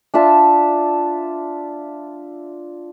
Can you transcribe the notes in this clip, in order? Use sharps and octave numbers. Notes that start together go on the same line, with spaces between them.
D4 F4 E5 A5